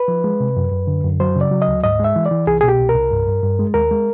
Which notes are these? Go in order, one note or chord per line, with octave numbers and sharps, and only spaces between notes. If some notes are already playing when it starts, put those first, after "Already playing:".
Already playing: B4
F3
G#3
C3
F#2
F#2
D3
F#2
F#3 C5
C#3
D5
F#3
D#5
D2
G#2 D#5
G#3 E5
E3
D5
E3
C2 G#4
B2 G#4
G4
C2
A#4
C2
G2
G2
G2
G#3
D#2 A#4
G#3